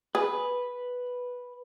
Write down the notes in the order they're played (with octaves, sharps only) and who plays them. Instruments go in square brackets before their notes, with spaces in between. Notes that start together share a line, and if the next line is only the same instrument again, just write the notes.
[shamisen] G#4 [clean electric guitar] B4